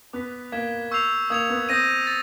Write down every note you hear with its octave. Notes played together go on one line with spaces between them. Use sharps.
B3 D6 F#6 B6
A#3 G#6 B6 E7 G7
C#6 E6 G6 C7 F7
A#3 D#6 G#6 C#7 F7
B3
C4 D#6 G6 A#6 D#7
A6